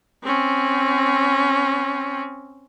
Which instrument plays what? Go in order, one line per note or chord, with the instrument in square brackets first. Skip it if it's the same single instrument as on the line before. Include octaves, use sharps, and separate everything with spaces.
[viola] C4 C#4